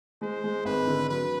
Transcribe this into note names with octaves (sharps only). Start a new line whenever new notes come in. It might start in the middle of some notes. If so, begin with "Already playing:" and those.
G#3 C5
G#3
G#1 B4
D3
F#3 B4